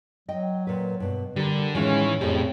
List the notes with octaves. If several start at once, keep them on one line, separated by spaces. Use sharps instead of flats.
F#3 D#5 G5
A#2 B4
G2 B2
D3 G3 G4 A#4
A2 D#3 E3 G#3 C#4 F4
F2 A2 D#3 F3 G3 C#4 G4 G#4